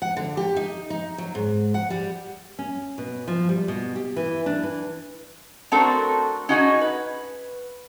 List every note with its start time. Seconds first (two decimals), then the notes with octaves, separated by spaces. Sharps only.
0.02 F#5
0.17 D3
0.37 G4
0.56 D#4
0.90 D#4
1.18 F#3
1.35 G#2
1.74 F#5
1.90 G3
2.59 C#4
2.98 B2
3.27 F3
3.49 G3
3.68 B2
3.96 G4
4.16 E3
4.46 D4
4.63 E3
5.72 A3 C4 D4 F#4 A4 A#4
6.49 C#4 D#4 F#4 G#4 D#5
6.81 B4